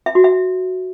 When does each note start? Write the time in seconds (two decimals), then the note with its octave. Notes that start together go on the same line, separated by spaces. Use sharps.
0.06 E5
0.15 F#4
0.24 E5